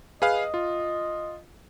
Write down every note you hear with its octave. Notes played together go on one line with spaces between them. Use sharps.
G#4 B4 D#5 F5
F4